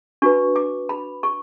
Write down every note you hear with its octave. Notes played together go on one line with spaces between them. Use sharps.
D4 F#4 B4 C#6
D6
B5
C#6